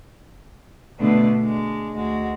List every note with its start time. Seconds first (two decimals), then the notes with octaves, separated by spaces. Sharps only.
0.98 B2 D3 A3 B3 D4 B4
1.39 G#3 D4
1.94 D2 G#3 F#4